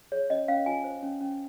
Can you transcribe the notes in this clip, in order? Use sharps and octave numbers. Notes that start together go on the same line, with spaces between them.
G#4 C#5
C#4 D#5
C#4 F5
F4 G#5
C5
C#4
C#4